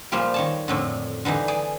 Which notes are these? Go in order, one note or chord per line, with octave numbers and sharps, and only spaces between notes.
A#2 F3 G3 A#3 F4 G4
D#3 C#5 A5
F2 A2 D3
D3 E3 G3 D#4
G#4 D5